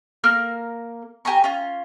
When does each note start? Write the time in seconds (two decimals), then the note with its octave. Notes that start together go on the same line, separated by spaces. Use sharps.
0.24 A#3 A#4 F6
1.25 G4 G#5 A#5 C#6
1.44 C#4 F4